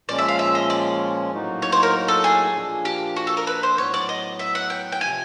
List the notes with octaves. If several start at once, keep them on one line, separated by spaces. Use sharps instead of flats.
A#2 F3 G#3 C#4 D5
E5
F5
E5
D#5
D5
A2 F#3 A#3 D#4 F#4
C#5
C5
A#4
A4
G#4
A#2 F3 A#3 D4
G4
F#4
A4
A#4
B4
C5
A2 F#3 B3 C#5
D5
D#5
E5
F#5
G5
G5
C3 F3 G#5